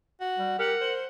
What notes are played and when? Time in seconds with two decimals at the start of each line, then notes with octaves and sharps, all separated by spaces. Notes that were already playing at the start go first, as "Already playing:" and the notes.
0.21 F#4
0.38 G3
0.59 G4 A#4 F#5
0.81 C5